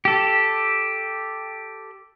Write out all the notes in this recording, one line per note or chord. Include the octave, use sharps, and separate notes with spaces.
G4 A4